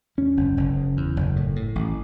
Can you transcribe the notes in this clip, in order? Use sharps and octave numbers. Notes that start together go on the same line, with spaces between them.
E2 C#4
F#1
F#1
C#3
E2
F#1
A2
A2
A1